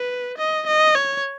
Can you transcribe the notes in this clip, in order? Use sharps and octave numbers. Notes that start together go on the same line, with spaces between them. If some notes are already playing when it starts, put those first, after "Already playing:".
Already playing: B4
D#5
D#5
C#5